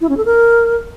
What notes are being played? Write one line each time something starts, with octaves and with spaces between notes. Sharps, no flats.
E4
C#4
A4
A#4